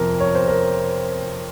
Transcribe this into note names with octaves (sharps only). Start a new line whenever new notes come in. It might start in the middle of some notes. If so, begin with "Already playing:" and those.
Already playing: F2 C3 A#4
C#5
C5
A#4